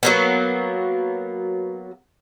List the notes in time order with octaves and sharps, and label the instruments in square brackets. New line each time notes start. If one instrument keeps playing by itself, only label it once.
[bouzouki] F#3 A#3 B3